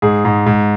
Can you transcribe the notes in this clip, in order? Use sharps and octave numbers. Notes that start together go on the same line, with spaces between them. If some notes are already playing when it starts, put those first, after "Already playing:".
G#2 G#4
G#2
G#2